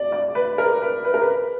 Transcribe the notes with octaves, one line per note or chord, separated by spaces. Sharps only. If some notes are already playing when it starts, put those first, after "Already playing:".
Already playing: D5
D5
B4
A#4
B4
B4
A#4
B4